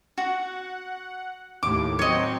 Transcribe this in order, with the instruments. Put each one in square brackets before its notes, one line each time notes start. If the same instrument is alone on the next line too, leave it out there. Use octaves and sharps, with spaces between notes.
[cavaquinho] F#4 [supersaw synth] F#5
[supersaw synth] D#2 A2 [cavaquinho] D6
[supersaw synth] F#3 C4 [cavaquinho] C#5 D#5